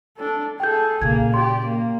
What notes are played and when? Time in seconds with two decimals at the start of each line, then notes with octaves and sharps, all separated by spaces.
0.17 D4 A4
0.60 G#4 A4 G5 G6
1.01 A#2 C#3 A#3 G#4 G#6
1.34 G4 D5 C6
1.65 A#3